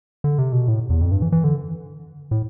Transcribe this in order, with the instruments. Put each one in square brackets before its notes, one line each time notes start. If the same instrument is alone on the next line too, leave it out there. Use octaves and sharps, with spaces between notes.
[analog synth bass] D3
C3
B2
A2
E2
F2
G2
E3
E3
D3
A2